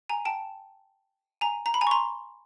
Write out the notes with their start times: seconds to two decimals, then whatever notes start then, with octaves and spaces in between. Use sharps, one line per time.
0.09 G#5 A#5
0.25 G5 A5
1.41 G#5 A#5
1.66 A#5
1.74 B5
1.81 G#5 A#5
1.87 C#6
1.91 A#5 C6